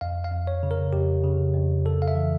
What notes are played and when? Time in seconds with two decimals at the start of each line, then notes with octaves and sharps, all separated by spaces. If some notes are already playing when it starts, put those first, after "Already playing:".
0.01 F2 F5
0.24 F5
0.31 F2
0.47 C#5
0.63 C#3
0.71 A#4
0.93 F2 G4
1.23 C#3
1.54 F2
1.85 C#3 A4
2.02 F5
2.08 E5
2.15 E3